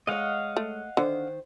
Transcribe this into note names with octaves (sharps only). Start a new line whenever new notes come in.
G#3 C#5 D#5 F5 F#5
A3
D3 D#3 C5